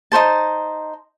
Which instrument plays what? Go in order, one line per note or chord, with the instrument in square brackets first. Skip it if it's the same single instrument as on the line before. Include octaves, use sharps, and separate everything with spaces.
[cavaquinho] D#4 F#4 C5 A5